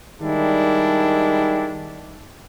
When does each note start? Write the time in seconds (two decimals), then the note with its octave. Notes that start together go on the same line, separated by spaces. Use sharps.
0.21 D#3 G3 G#3 D4 E4